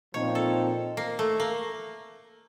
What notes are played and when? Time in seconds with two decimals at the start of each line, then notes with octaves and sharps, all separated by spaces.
0.14 A#2 F3 C4 D#4 C#5
0.35 A4
0.97 A#3
1.19 A3
1.40 A#3